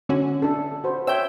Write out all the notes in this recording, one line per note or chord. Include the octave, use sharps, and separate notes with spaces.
D3 C#4 F#4
D4 A4
F#4 C5 B5
C#5 E5 G5 E6 G6